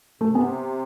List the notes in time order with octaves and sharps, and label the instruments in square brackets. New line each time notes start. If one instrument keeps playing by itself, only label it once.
[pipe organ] C3 [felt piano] A3
[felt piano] B3